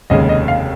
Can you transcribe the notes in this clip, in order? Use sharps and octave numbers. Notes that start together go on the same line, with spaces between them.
F1 D#2 C#3 G#3 D#5
D#5
F5